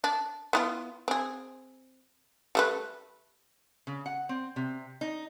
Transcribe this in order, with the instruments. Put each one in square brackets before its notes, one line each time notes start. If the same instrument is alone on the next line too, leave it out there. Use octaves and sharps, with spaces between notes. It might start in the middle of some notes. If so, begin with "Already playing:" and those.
[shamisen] D4
B3 E4 F4
C4 G#4
G3 A3 B4
[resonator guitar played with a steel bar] C#3
F#5
C4
C3
D#4